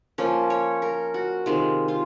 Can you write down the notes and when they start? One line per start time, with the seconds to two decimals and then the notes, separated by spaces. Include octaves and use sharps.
0.18 F3 A#3 C#4
0.50 C#5
0.82 A#4
1.14 F#4
1.46 C3 D#3 G#3 F4
1.88 F4